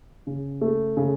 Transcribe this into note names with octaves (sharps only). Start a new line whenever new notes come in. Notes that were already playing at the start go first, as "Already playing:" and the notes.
C#3
A3
C#3